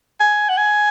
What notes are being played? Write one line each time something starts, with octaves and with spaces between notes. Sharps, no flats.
G#5
F#5
G#5